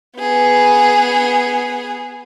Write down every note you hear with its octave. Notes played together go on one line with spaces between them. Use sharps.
B3 G#4